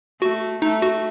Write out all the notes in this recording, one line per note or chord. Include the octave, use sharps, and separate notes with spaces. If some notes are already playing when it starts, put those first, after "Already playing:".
A3 F#4
A3 D#4
F#4